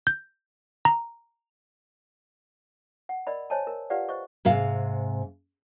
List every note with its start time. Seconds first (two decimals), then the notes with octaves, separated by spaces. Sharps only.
0.07 G6
0.85 A#5
3.09 F#5
3.27 A#4 D5 D#5 B5
3.50 C5 C#5 D#5 G#5 A5
3.67 A#4
3.90 F4 G4 B4 D5 F5 F#5
4.09 C5 D#5 C#6
4.45 G#2 C3 F5